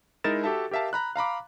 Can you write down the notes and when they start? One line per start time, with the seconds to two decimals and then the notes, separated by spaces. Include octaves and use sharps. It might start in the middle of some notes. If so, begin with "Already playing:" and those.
0.24 G#3 D#4 E4 A#4 A6 E7
0.44 F#4 G4 A4 E5 A5
0.71 G4 A#4 E5 F5 A5
0.93 A#5 B5 F#6
1.16 F5 A#5 B5 D6